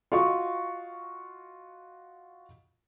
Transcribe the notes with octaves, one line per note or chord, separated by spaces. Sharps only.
F4 F#4 D#5 C#6